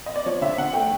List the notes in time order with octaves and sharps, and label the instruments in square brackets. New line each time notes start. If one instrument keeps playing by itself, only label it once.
[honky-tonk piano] D#5
D5
F3 C#5
D3 E5
D3 F#5
A3 G5